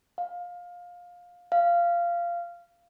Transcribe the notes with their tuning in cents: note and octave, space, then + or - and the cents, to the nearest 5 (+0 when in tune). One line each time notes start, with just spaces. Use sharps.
F5 +20
F5 -15